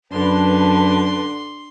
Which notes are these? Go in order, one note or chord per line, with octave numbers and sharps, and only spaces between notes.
F#2 D3 B4 A5 C6